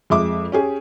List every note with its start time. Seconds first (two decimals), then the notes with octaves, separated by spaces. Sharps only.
0.10 F2 G#3 E5 D6
0.52 C#4 G4 G#4